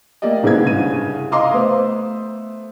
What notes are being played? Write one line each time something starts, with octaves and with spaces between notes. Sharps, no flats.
A3 A#3 G4 D5 D#5
C2 G#2 C#3 B3 G#6
C2 G2 C#3 D#7
D#5 F5 A#5 C6 D6 D#6
A3 B3 C5